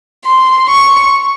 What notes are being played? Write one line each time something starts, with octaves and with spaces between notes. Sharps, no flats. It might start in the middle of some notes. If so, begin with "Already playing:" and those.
C6
C#6